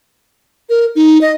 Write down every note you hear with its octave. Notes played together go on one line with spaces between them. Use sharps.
A#4
D#4
D#5